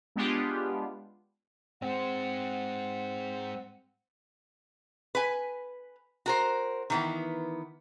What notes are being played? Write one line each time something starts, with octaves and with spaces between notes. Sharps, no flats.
G#3 B3 D4 F4 G4
G#2 G#3 C4 F#5
B4 G#5
F#4 A#4 C5
D#3 E3 B3